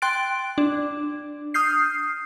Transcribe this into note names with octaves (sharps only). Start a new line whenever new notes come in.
G5 C6 F#6 A6 D7
D4
D#6 F6 G6 C7